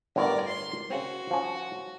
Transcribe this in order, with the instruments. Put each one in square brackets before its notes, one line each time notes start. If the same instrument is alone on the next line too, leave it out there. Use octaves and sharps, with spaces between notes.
[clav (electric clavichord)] G1 A2 D3 [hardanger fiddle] A#4 D5
[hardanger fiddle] C6
[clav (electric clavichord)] C#3 C4 [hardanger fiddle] F#4
[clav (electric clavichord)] F3 C#4